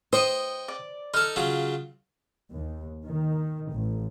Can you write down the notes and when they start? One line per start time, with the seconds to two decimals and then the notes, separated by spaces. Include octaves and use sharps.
0.13 C5 D#5 G5 C#6 D#6
0.68 D5
1.14 D#4 A4 F6
1.36 C#3 F#3 F4
2.52 D#2
3.04 D#3
3.70 A1